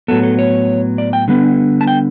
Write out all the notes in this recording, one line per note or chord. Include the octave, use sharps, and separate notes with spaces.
A2 F#3 B3 A4
A4
C#5
D5
G5
D3 G3 B3
A5
G5